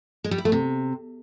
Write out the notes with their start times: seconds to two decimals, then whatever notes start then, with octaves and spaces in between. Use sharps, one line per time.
0.24 G#3
0.31 G3
0.38 E4
0.45 A3
0.52 C3